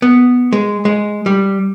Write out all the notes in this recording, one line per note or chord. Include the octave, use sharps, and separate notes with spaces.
B3
G#3
G#3
G3